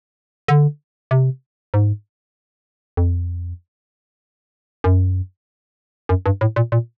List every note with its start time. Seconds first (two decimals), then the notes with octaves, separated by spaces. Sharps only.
0.48 D3
1.11 C3
1.74 G#2
2.97 F2
4.84 F#2
6.09 F#2
6.26 G2
6.41 A2
6.56 A#2
6.72 A#2